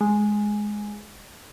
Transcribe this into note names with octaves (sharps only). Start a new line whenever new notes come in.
G#3